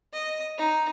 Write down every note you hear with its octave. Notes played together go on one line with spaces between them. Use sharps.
D#5
D#4